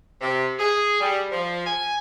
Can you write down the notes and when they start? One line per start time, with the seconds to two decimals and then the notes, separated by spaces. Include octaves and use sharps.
0.21 C3
0.59 G#4
1.01 G3
1.32 F3
1.66 G#5